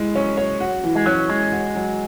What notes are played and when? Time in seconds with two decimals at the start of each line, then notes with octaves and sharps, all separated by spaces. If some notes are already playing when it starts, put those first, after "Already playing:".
Already playing: G#3 E4
0.15 F#3 C#4
0.37 C#5
0.60 F#4
0.84 E3
0.96 G#3
1.06 F#3 C#4
1.30 E3 G#3
1.52 F#4
1.75 F#3